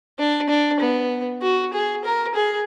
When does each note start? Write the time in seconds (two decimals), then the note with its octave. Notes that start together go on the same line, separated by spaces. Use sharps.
0.19 D4
0.49 D4
0.80 B3
1.42 F#4
1.73 G#4
2.05 A#4
2.35 G#4